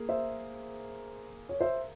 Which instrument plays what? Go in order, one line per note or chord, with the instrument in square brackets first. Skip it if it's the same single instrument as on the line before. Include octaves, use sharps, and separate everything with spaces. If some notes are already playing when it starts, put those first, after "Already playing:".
Already playing: [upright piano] A#3 G#4
[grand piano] C5 E5
C#5
C5 E5